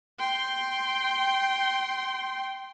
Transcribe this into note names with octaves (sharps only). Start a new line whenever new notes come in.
G5 C6